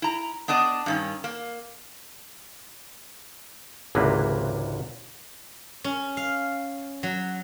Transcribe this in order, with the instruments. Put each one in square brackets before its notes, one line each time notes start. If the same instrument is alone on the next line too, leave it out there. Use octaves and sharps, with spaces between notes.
[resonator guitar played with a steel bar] E4 A#5
B3 D4 D5 D#5
G2 D#3 C#4
A#3
[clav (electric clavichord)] G#1 C#2 C3 E3 A#3 B4
[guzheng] C#4
F5
F#3